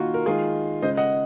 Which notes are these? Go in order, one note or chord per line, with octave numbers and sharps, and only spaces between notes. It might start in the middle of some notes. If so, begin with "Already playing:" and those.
Already playing: D#3 A#3 F4 F#4
A#4
D#3 G#3 F4 G#4
C#3 G#3 C5 D#5
D#5 F#5